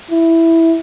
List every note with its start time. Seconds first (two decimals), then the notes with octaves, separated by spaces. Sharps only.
0.11 E4